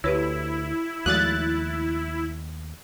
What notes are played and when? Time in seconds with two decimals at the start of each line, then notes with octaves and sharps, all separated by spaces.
0.04 D2 E4 G4 B4 C#5
1.06 D#2 F3 G#3 A3 F#4 F#6 A6